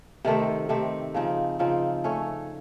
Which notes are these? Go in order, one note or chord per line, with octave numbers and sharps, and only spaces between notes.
C3 D#3 A3 C4
C3 D#3 A3 C4
C#3 F3 C4 D#4
C#3 F3 C4 D#4
A3 C#4 A4 C#5